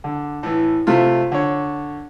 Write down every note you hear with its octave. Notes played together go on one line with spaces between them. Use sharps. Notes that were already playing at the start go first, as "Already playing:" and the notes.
D3
A2 E3
C3 A3 F4
D3 C#5